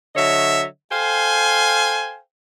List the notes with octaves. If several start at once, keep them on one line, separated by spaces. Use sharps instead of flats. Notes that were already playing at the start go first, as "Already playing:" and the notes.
D3 F#3 C#5 D#5 E5
A4 C5 F5 G5 G#5